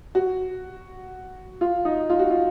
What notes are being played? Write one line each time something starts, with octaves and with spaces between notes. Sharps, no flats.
F#4
F4
D#4
F4
F#4
F4